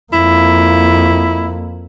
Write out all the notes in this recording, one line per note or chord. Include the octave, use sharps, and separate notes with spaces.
F2 A#3 E4